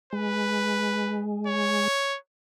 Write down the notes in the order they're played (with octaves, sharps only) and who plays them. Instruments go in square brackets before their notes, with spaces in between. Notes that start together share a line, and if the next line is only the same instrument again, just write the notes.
[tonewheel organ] G#3 [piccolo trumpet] B4
[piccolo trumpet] C#5